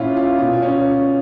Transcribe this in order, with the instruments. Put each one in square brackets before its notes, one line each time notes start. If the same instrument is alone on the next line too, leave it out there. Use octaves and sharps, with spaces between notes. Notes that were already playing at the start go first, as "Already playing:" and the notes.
Already playing: [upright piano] A#2 C#4 E4 F4
F4
B2 F4
C#4